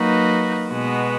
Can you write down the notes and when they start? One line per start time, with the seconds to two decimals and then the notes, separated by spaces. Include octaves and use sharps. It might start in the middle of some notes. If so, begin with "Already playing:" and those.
Already playing: F#3 A#3 D#4 F#4 B4
0.70 B2 G#3 B3 F#4